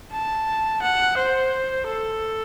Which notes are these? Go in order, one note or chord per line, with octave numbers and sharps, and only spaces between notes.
A5
F#5
C5
A4